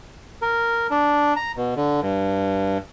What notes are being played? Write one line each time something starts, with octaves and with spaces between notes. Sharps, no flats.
A#4
D4
A#5
B2
D3
G2